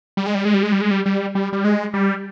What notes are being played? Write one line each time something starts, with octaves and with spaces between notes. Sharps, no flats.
G3
G#3
G3
G#3
G3
G#3
G3
G#3
G3
G3
G3
G3
G#3
G3